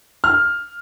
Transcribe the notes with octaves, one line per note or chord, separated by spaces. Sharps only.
F6